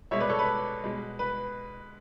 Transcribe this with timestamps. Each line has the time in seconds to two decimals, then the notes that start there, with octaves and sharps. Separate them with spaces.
0.11 B2 G#3 C#5 E5
0.20 B4 D5
0.29 A4 C#5
0.39 B4
0.84 B2 G#3
1.19 B4